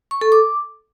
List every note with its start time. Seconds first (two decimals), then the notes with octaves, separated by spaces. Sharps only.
0.11 C#6
0.21 A4
0.32 D6